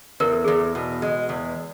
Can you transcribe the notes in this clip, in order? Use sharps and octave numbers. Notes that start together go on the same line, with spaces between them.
E2 A#4
A4
E2 G#4
A4
B2
G#3
E2